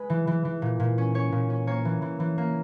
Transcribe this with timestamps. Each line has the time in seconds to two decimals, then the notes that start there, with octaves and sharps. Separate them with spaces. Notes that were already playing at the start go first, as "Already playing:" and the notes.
Already playing: G#3 G#4 B4
0.10 E3
0.27 E3
0.45 E3
0.62 A#2
0.80 A#2
0.98 C#4
1.14 C#4 C#5
1.32 A#2
1.50 C#4
1.67 A#3 C#5
1.85 E3
2.02 E3
2.20 E3
2.38 A#3